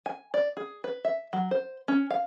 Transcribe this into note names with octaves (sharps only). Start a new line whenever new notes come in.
G#5
D5
G#4
B4
E5
F#3
C5
C#4
F5